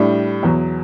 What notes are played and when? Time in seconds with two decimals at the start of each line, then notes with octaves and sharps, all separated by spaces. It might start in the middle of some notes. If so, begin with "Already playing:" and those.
Already playing: A2 G3 D4
0.43 E2 B2 F#3